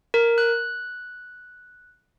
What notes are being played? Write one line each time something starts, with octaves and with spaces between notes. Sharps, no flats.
A#4
F#6